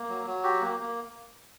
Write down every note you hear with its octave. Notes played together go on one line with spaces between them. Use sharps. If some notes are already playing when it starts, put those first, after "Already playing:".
Already playing: A#3
F#3
F#3
F#4 G4
A#3
A#3